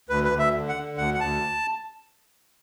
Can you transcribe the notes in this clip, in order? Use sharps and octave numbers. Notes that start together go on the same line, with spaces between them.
D2 B4
B4
D2
E5
D3
F#5
D3
D2 F#5
F#5
D2 A5